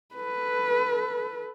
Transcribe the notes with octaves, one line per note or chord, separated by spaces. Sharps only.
A4 B4